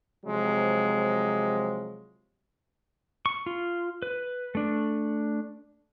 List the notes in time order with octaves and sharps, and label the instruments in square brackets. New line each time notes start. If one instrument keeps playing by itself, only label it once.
[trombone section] C3 F3 F#3 G#3
[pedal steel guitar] C#6
F4
B4
A3 D4